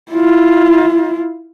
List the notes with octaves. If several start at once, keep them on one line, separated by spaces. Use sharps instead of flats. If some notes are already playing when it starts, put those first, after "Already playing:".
E4 F4